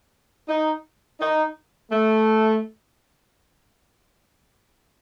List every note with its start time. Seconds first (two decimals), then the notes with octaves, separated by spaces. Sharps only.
0.48 D#4
1.20 D#4
1.90 A3